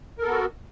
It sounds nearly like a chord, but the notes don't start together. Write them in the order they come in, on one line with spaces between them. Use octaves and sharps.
A#4 A4 B3 F#4